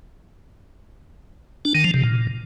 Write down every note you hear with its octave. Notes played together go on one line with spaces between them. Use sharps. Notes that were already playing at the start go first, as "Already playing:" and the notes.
D4
D#3
F3
C3
A#2